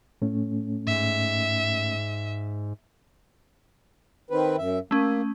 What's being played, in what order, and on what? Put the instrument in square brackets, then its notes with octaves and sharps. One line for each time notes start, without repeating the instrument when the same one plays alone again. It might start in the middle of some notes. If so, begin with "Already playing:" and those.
[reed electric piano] A2 A3 C#4
[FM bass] G#2 [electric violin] E5
[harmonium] D#3 C4 B4
F#2 E5
[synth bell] A3 C#4 [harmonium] A#3